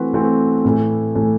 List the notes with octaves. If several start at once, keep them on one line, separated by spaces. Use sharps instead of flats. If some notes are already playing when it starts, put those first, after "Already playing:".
Already playing: E3 A3 C4 F#4 B4
E3 A3 C4 F#4 B4
A2 E3 A3
A2 E3 A3